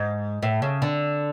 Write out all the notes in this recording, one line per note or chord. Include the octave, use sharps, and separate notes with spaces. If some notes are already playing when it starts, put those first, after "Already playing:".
Already playing: G#2
A2
C#3
D3